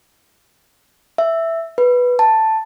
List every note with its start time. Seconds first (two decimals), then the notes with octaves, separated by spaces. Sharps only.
1.18 E5
1.78 B4
2.19 A5